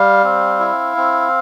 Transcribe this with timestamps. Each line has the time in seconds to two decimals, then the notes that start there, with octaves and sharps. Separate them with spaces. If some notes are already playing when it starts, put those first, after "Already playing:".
Already playing: G3 F5
0.24 C4
0.59 E4
0.97 C4